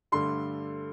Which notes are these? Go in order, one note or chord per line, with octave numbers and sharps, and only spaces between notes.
G2 D3 A3 C6